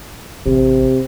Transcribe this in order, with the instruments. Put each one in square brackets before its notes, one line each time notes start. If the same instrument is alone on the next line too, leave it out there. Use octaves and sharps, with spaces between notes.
[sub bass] A1 [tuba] C3